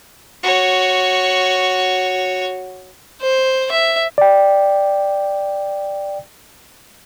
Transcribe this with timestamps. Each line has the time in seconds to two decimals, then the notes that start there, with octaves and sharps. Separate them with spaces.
0.43 F#4 C#5
3.22 C5
3.71 E5
4.18 D5 G5